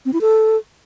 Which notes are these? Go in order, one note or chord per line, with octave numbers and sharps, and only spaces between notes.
C4
E4
A4